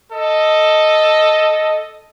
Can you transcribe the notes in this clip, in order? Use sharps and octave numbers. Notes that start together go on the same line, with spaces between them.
A4 D#5